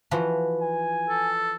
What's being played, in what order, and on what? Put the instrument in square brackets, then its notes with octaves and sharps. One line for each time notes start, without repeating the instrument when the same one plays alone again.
[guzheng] E3 F3 F#4
[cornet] G#5
[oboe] A4